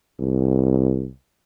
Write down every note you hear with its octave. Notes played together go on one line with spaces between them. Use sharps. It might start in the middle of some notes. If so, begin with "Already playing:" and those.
C2